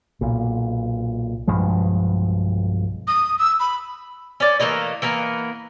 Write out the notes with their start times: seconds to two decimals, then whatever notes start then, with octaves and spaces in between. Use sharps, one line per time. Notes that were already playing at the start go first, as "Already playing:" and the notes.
0.21 B1 A#2
1.47 B1 G2 F3 G#3
3.08 D#6
3.39 E6
3.60 B5
4.40 C#4 D5
4.60 E3 A3 A#3 D#5
5.02 E3 A#3 B3 A#4